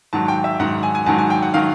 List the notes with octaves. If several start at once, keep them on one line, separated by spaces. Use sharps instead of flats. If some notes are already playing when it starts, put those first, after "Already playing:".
G#2 D#3 F#3 A5
G5
E5
G#2 D#3 F#3 F#5
G#5
G#5
G#2 D#3 F#3 A5
G#5
G5
F#5
D#3 F#3 F5